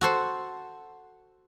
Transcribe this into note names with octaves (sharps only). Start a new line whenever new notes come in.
F#4 A4 C5